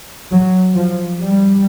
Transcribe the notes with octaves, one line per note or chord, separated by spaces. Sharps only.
F#3
F3
G3